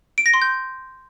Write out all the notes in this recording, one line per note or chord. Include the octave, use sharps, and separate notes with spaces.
D7
A#6
C6
G6